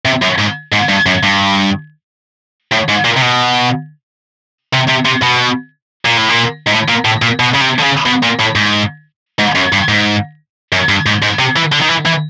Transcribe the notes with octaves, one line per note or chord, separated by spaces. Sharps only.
C3
F#2
G#2
G#2
G2
F#2
G2
A2
G#2
A#2
C3
B2
C3
C3
C3
B2
A#2
A2
A#2
G#2
A2
A#2
A2
A#2
B2
C#3
C3
D3
C#3
B2
A#2
A2
G#2
G#2
F#2
G2
G#2
F#2
G2
G#2
G#2
C3
E3
D3
D#3
E3
E3